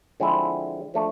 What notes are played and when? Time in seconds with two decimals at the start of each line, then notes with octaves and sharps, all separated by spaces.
0.20 D3 F3 G#3 C4 E4
0.94 F3 A3 D4